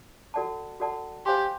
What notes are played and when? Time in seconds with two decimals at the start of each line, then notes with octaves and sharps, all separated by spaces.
0.34 F#4 A4 D5 F#5 A5
0.80 F#4 A4 D5 F#5 A5
1.26 G4 C5 F5 G#5 C6